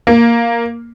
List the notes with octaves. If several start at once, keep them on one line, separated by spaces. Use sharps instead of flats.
A#3